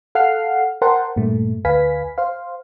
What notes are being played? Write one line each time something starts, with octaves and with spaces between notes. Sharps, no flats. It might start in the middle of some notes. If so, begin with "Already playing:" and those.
A4 F5 F#5 F6 C7
A#4 C5 F#5 G5 A5 C6
G2 A#2 A3
D2 B4 F5 G#5 B6
C5 F5